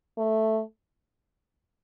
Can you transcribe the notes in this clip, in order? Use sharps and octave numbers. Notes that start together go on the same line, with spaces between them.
A3